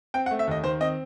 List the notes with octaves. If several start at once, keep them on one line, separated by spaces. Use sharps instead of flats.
C4 G5
F#5
A3
E5
D#2 D#5
D#3 C5
C4 D#5